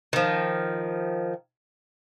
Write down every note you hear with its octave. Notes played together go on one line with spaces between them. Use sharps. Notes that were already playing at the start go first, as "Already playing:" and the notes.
D#3 F3